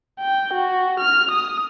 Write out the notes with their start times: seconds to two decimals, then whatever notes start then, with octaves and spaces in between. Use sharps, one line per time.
0.19 G5
0.54 F#4
1.00 F6
1.31 D#6